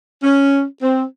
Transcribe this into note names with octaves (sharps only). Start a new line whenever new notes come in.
C#4
C4